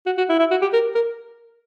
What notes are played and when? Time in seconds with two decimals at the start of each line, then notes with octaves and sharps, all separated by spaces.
0.06 F#4
0.18 F#4
0.29 E4
0.39 E4
0.51 F#4
0.62 G4
0.73 A#4
0.95 A#4